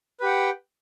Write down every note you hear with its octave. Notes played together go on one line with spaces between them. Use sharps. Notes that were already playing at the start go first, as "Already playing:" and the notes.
G4 B4 F#5 G5